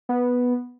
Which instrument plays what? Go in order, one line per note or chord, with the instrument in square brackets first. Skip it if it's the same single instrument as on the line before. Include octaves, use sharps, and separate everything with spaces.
[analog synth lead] B3